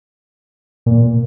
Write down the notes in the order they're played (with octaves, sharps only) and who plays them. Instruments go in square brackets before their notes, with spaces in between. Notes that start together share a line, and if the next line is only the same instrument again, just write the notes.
[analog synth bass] A#2